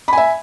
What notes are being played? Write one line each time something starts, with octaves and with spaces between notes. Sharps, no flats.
E5 G#5 B5